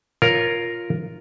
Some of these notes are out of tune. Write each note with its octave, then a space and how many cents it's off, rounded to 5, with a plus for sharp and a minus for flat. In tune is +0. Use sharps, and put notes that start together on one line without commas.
F4 +0 A#4 +0 C#5 +0